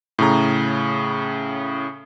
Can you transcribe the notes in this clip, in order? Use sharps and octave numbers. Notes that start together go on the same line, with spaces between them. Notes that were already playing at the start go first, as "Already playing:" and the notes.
A2 C#3 A#5